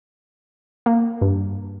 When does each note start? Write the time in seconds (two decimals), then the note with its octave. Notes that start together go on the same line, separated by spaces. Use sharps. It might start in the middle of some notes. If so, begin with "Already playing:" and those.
0.86 A#3
1.21 G2